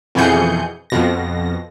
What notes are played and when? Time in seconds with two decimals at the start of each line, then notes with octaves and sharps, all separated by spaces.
0.15 F2 B2 E3 G#4 G6 C#7
0.90 F2 B2 A#6